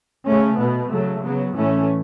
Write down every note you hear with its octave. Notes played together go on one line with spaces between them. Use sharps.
C#3 A3 C#4
B2 B3
C#3 F#3 A3
C#3 F#3 B3
A2 E3 A3 C#4